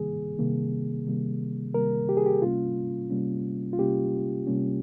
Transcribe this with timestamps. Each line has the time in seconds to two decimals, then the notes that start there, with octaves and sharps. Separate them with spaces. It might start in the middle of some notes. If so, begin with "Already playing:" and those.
Already playing: C3 D#3 G3 A#3 G#4
0.39 C3 D#3 G3 A#3
1.06 C3 D#3 G3 A#3
1.74 C3 D#3 G3 A#3 A#4
2.09 G4
2.17 G#4
2.26 G4
2.42 C3 G3 A#3 C#4 F4
3.10 C3 G3 A#3 C#4
3.73 F4
3.78 C3 G3 A#3 C#4 G4
4.47 C3 G3 A#3 C#4